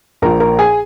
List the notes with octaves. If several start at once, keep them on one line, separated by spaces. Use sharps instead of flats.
A#1 A#2 F3 A#4 A#5
A#4 A#5
G#4 G#5